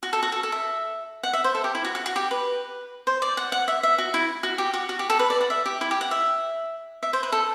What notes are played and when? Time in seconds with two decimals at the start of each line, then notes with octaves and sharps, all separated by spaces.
0.03 F#4
0.13 A4
0.23 F#4
0.32 A4
0.43 A4
0.52 E5
1.23 F#5
1.33 E5
1.44 C5
1.55 A4
1.64 G4
1.75 E4
1.84 F#4
1.95 F#4
2.06 F#4
2.16 G4
2.31 B4
3.07 C5
3.22 D5
3.37 F#5
3.52 F#5
3.68 E5
3.83 E5
3.98 F#4
4.14 E4
4.43 F#4
4.58 G4
4.74 F#4
4.89 F#4
4.99 G4
5.10 A4
5.19 B4
5.30 D5
5.41 F#5
5.50 E5
5.66 G4
5.81 E4
5.91 G4
6.01 F#5
6.11 E5
7.03 E5
7.13 C5
7.23 B4
7.32 A4